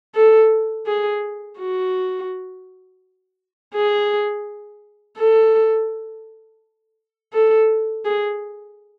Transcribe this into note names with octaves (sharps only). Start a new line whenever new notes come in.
A4
G#4
F#4
G#4
A4
A4
G#4